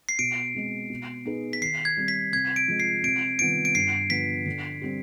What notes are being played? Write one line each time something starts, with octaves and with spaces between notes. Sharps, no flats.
C7
B2 D7
G#3 C4
B2
B3 D#4 G#4 B4
B6
D#3 C7
G#6
G3 C4
B6
C3 G#6
D7
F3 G#3
C7
C3 D7
D#3 G3 B3 F4 D7
D7
G2 C7
D3 F3 B3 F4 B6
D3
G3 C4 G4